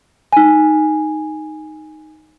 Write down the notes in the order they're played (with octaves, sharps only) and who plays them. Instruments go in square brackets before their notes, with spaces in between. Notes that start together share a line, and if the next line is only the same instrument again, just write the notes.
[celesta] D#4 G#5